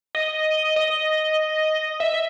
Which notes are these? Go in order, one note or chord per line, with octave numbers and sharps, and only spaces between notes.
D#5
D#5
E5